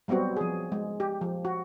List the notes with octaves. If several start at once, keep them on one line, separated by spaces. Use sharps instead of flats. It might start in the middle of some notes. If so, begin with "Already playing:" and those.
F#3 G3 B3 C4 F#4
F3 G#4
G#3
G4
F3
F#4